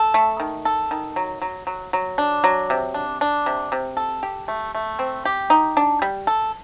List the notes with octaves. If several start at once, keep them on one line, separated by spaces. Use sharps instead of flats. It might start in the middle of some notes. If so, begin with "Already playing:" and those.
Already playing: A4
A3
D#3
A4
D#3
F#3
F#3
F#3
F#3
D4
F#3
C3
D4
D4
C3
C3
A4
G4
A3
A3
C4
G4
D#4
D4
G3
A4